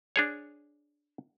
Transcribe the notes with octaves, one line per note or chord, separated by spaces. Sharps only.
D4 G#4 C#5